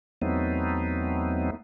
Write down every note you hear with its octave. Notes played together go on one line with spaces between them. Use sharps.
E2 F#3 A3 B3 C4 D#4